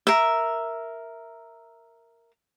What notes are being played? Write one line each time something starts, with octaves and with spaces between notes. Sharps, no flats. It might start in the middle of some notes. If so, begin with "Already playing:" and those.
A#4 E5